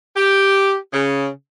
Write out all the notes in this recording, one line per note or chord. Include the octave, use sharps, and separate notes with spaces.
G4
C#3